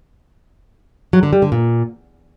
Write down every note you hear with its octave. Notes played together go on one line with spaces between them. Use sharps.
F#3
D3
G3
D3
A#2